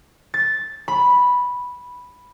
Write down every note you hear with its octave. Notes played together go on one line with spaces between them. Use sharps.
A6
B5